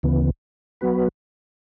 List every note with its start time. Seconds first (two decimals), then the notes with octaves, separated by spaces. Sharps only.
0.03 D2 C#3 E3 B3
0.81 F#3 B3 F#4 B4